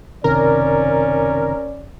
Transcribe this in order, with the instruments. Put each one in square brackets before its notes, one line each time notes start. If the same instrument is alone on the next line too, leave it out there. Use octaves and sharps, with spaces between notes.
[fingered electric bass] F#1 C3 D#3 [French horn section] C#4 D5 [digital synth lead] A#4